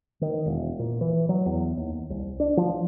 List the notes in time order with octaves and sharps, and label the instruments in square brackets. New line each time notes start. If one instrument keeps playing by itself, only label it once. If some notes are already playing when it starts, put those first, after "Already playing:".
[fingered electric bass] D#3
E1
A#2
E3
F#3
E2
D#2
C2
D4
F3